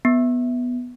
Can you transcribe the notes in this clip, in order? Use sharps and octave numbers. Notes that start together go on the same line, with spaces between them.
B3